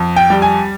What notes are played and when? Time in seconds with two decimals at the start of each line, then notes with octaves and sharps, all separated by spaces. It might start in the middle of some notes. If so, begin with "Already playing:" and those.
Already playing: F2
0.16 G5
0.30 G3
0.42 G#5